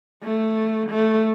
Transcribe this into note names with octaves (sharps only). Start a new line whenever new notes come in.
A3
A3